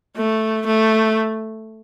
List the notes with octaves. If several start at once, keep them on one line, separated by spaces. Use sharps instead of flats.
A3
A3